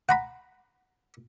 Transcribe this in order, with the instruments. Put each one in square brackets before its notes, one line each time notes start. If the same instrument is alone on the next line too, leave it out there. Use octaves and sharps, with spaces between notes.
[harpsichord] F#5 A#5 B5